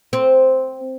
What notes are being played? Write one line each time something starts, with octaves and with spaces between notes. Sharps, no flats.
C4